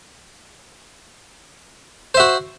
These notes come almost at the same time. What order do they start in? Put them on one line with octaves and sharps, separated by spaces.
C5 E5 F#4